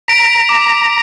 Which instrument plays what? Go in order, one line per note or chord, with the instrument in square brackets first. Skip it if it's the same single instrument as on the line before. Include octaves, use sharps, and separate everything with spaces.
[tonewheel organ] A#5 [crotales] B6 D7
[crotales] D6